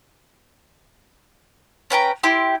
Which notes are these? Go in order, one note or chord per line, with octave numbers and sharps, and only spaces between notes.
C#4 B4 G5 A#5
E4 G4 C6